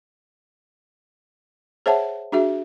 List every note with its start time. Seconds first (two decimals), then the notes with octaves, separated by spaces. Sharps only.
1.86 G#4 C5 C#5 E5 F#5 A5
2.32 D4 F#4 G#4 E5